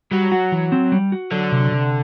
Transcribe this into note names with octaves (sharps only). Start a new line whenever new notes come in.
F#3 G3
F#4
E3
C4
G3
F#4
D3 F#3
C3
C3